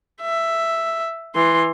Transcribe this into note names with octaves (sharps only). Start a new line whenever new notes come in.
E5
E3 C6